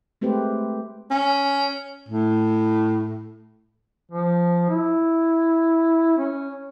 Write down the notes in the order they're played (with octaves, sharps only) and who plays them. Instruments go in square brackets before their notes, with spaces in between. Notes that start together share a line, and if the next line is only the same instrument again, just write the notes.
[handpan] G#3 A3 C4 G4 B4 C5
[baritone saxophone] C#4
A2
[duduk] F3
E4
C#4